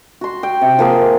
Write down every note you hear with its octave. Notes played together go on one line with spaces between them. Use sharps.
F#4 C6
G5
C3
F3 A#3 G#4